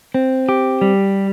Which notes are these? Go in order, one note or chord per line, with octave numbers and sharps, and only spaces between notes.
C4
G4
G3